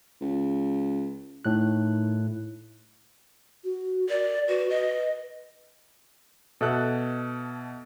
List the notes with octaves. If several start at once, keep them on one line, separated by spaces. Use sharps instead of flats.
C#2
A2 D#3 F#6
F#4
A#4 D5
F#4 B4
D#5
B2 A4 E5 F#6